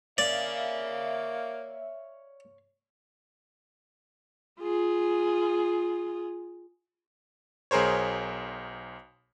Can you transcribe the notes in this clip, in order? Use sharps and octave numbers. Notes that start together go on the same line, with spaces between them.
A#3 C#5 D5 E5 F5
F4 G#4
B1 G#4 A#4 C5 C#5